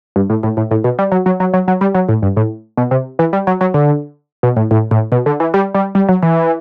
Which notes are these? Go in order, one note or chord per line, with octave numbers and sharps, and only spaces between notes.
G2
A2
A2
A2
A2
B2
G3
F#3
F#3
F#3
F#3
F#3
G3
F#3
A2
G2
A2
B2
C3
E3
G3
F#3
F#3
D3
B2
A2
A2
A2
B2
D3
E3
G3
G3
G3
F#3
E3